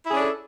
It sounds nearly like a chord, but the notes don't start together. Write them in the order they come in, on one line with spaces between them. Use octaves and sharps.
E4 G#4 C#4 D4 A4